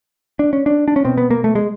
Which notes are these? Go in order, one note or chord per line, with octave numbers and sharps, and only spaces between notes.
D4
C#4
D4
D4
C#4
B2 C4
B3
A#3
A3
G#3